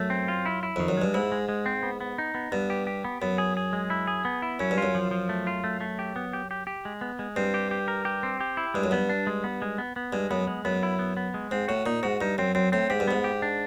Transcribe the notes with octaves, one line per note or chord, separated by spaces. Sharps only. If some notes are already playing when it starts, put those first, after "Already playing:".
Already playing: F#2 A3
C4
F4
E4
E4
F2 D#3
F#2
G2 G#3
G#2 E4
G#3
G#3
C4
B3
B3
D#4
B3
G2 B3
G4
G4
B3
F#2 B3
G#4
G#4
G#3
E4
G#4
B3
E4
F#2 C#4
G2
F#2 F4
F3
F3
A3
F4
A3
A3
G4
B3
G4
G4
G4
G#3
B3
G#3
G2 C4
G4
G4
A#4
G4
C4
G4
E4
G2 G#3
F#2
G2 B3
D4
G#3
B3
G#3
B3
B3
G2 G#3
F#2 B3
G#3
F#2 B3
E4
B3
B3
G#3
G#2 C4
A2 F#4
A#2 D#4
G#2 F#4
G2 D#4
F#2 C4
F#2 C4
A2 C4
G#2 G4
G2
G#2 B3
G4
D4